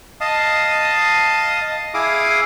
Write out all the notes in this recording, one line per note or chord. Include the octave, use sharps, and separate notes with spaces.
D#5 F5 A5 D#6
E4 G#4 F5 D6 D#6